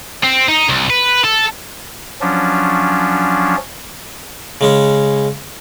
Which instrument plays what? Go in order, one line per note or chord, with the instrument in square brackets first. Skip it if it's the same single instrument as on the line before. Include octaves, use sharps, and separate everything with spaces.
[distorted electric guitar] C4
D#4
C2
B4
A4
[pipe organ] F3 F#3 C#4 D4
[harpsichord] C#3 G#3 C#4